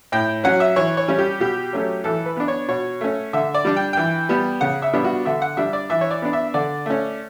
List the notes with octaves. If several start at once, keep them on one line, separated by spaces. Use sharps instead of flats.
A2 G5
F#3 C#4 F#5
E5
E3 C#5
C#5
G3 C#4
G4
B2 G4
F#3 A3 C#4
E3 A4
B4
B3 D4
C#5
B2 C#5
A3 C#4
D3 E5
D5
G3 D4
G5
E3 G5
G3 B3
C#3 F#5
E5
G3 B3 D4
F#4
D3 E5
F#5
G3 D4 E5
D5
E3 E5
C#5
D5
B3 D4
E5
D3 D5
A3 C#4